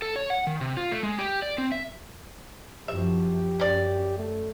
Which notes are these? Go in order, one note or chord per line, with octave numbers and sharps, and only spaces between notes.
A4
C#5
F#5
D#3
C3
F4
A3
G#3
G4
D5
C4
E5
F#2 F3 G4 E5
F#2 C#4 D5
A3